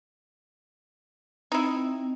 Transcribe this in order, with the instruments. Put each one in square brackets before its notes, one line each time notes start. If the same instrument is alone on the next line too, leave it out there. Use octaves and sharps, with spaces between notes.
[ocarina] C4 [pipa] D#4 E4